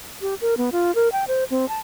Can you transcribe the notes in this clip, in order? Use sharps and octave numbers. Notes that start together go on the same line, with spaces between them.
G4
A#4
B3
F4
A#4
G5
C5
C4
A5